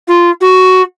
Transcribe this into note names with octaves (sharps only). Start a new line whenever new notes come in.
F4
F#4